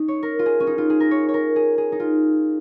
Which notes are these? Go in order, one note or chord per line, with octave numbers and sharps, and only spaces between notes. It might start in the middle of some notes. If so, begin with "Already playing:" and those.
Already playing: C#4 D#4
C#5
A#4
F4
G#4
C#4
D#4
F4
G#4
A#4
C#5
C#5
A#4
G#4
G#4
D#4
F4